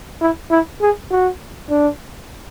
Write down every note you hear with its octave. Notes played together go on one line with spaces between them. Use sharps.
E4
E4
G#4
F#4
D4